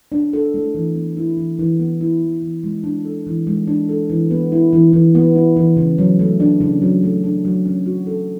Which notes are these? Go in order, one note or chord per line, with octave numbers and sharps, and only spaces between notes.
D4
A4
A3
E3
B3
E4
E3
E3
B3
E4
E3
E3
G#3
D4
A4
E3
G#3
D4
A4
E3
B3
E4
E3
E3
B3
E4
E3
C#3
F#3
A3
D4
C#3
F#3
A3
D4
F#3
C#4
F#4
A4